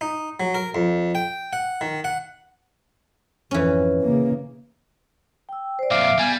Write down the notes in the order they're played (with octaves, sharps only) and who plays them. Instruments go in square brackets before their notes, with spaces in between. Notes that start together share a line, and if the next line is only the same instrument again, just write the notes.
[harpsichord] D#4
F#3
A#4
F2
G5
F#5
D#3
F#5
[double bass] G#1 F2 [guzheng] E3 C#4
[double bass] C#3 A#3
[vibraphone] G5 E6
C5 D5
[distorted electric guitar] F2 A#2 [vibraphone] E5 [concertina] F5 D6
[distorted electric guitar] G3 [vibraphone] B3 [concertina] G#5